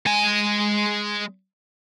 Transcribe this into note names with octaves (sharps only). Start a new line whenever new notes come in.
G#3 G#5